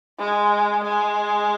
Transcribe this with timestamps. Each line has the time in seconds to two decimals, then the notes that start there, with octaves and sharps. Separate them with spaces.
0.19 G#3
0.84 G#3